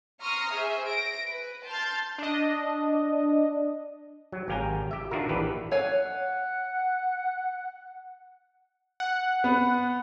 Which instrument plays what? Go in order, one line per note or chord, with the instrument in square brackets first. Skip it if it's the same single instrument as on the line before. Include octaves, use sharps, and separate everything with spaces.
[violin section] A#5 C6 C#6 D#6 F6
G#4 C5 E5
A#6 D7
B4
A5 C6 F6 G6 A6
[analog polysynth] D4 D#5
[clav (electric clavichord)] F#3
G#1 G4 F5 G5 G#5 A#5
G4 E5
D#3 D4 F4 F#4 A#4
A#1 E3 G4 B4
[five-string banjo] C#5 F5 G#5 [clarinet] F#5
[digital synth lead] F#5
[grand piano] B3